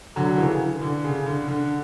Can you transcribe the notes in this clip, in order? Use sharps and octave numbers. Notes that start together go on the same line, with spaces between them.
D3 F#3
C#3 E3
D3
C#3
D3
D3